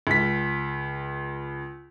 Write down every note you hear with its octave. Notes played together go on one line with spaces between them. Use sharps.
C#2 B6